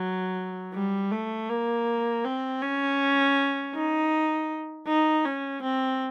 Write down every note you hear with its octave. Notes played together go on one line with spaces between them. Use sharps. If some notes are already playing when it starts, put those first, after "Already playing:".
Already playing: F#3
G3
A3
A#3
C4
C#4
D#4
D#4
C#4
C4